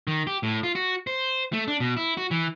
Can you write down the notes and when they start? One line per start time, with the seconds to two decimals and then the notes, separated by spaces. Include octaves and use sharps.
0.08 D#3
0.27 G4
0.43 A2
0.63 F4
0.75 F#4
1.07 C5
1.53 A3
1.68 D4
1.80 B2
1.97 E4
2.17 F#4
2.31 E3